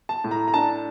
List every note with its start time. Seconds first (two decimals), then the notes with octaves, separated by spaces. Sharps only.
0.09 A5
0.24 A2
0.31 A#5
0.48 A#5
0.54 D4 A5